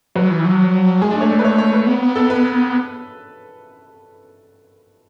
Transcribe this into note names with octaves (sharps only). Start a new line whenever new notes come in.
F#3 B4
E3
F#3
G#3 G#4
D4
A3 C#5
D5
B4
C#5
C#5
B4
B3
B3
A4
B4